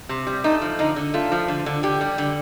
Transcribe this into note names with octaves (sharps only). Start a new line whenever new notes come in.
C3
G3
A3 D#4
F3
D3 D#4
D3
A3 F4
F3
D3
D3
D3 G4
G3
D3